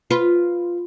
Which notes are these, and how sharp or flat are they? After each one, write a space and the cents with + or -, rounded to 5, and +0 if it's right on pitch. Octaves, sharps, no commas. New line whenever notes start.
F4 +0 B4 +0